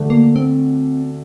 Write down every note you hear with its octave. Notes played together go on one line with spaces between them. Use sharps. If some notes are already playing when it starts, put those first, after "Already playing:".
Already playing: D2 D3 A3 D4
A#3
C4